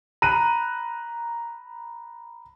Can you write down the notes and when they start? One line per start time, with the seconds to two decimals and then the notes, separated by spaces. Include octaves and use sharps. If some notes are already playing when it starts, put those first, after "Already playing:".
0.22 A#5 B5 F#6 D#7